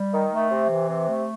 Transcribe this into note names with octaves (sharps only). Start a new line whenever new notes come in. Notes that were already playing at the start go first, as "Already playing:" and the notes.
Already playing: G3
D#3
A3
C3
E3
C3
A3